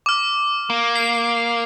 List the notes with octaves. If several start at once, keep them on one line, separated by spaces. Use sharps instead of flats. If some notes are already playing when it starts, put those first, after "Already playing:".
D6 F6
A#3
C7